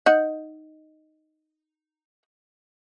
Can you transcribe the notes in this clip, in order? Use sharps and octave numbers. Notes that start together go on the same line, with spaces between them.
D#4 F#5